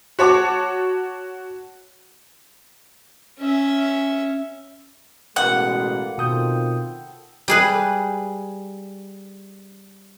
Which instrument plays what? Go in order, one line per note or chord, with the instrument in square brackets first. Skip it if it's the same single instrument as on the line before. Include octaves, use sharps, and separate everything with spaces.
[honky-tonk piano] F#4 C#5 A5 D6
[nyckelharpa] C#4 E5
[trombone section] A1 B2 G#3 [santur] A#3 B3 A5 [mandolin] F#5
[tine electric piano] B2 D#6 G6 [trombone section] D#3 C4 F4 [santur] A4 G5
[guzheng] G3 G#4 B4